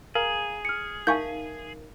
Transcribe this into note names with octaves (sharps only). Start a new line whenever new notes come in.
G#4 A#4 F5 A#5
F6 C#7
D#4 A#4 E5 F5 G#5 C#6 G6